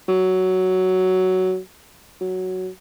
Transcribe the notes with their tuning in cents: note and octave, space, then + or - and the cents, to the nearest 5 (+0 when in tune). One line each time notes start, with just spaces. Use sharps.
F#3 +10
F#3 +5